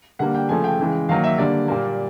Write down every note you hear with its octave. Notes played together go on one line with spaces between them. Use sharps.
D3 G3 A#3 F#5
G5
C#3 F3 A3 G#5
G5
C#3 E3 G#3
D#3 F#3 A#3 F5
E5
D3 G3 A#3 D5
A#2 G3 A#3